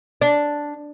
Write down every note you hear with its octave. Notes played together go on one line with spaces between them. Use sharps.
D4